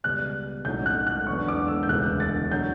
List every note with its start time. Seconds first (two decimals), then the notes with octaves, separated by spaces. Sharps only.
0.04 C#2 B2 G3 F#6
0.65 B1 A2 F#3 C#4 G6
0.86 F#6
1.07 F#6
1.27 E2 D3 F#3 C#6
1.48 D6
1.68 E6
1.83 G6
1.89 E1 D2 C#3 E3 B3 F#6
2.20 A6
2.52 D3 F#3 G6